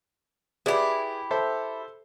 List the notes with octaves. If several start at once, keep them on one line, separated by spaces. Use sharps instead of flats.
E4 G4 G#4 B4 D5
A4 C5 E5